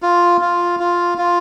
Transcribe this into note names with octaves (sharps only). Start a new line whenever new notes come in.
F4
F4
F4
F4